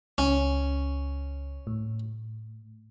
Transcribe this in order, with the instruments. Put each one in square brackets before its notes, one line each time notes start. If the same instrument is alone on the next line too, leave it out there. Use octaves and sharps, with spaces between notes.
[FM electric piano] C#2 [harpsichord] C#4
[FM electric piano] A2